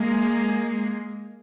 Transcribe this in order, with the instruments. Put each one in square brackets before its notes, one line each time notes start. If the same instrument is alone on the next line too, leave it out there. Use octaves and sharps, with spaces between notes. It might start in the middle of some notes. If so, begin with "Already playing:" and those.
Already playing: [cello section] G#3 A#3